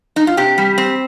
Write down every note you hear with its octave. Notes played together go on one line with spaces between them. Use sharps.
D#4
F4
C3 G4
G3
C4